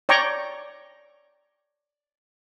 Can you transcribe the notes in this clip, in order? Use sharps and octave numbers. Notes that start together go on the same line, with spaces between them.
C#5 D5 G5 A#5 C#6